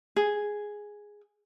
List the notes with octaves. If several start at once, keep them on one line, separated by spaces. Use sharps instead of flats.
G#4